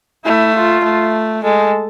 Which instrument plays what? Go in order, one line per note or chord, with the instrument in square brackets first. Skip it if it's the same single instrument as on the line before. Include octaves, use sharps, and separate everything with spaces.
[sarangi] A3 [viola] E4
[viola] F4
[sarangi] A3
[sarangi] G#3 [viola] A4